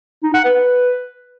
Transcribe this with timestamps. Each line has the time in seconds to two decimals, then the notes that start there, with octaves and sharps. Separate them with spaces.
0.23 D#4
0.34 F#5
0.45 B4